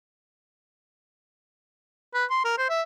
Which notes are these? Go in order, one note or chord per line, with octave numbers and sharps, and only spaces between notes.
B4
C6
A#4
C5
E5